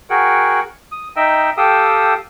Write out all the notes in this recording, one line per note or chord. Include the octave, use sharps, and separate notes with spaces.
F#4 G#4 A#4 F#5 G5
D#6
D#4 D#5 E5 G5 E6
G4 A4 F5 G5 D#6 E6